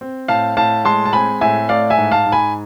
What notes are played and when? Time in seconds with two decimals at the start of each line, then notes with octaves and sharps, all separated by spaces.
0.01 C4
0.28 A2 F5 A5
0.57 A2 F5 A5
0.85 G#3 A5 C6
1.05 A5
1.13 C4 G#5 B5
1.41 A2 E5 G#5
1.69 A3 D5 F5
1.90 E5 G#5
1.97 G#2
2.11 F5 A5
2.26 G#2
2.32 G#5 B5